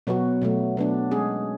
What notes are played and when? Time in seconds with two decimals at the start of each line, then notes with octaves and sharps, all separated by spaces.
0.07 B2 F#3 B3 F#4
0.42 B2 F#3 A3
0.77 F#3 B3 D4
1.11 G#3 C#4 G#4